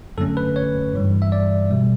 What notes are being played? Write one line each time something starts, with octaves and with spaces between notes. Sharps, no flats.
F#2 D3 A3 C#4 A4
B4
C#5
G2 E3 G3
E5
D5
B2 G3